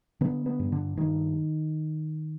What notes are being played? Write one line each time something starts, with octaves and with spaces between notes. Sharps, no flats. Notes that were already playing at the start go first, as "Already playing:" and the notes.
D3 B3
B3
G2
D3
G2 D#3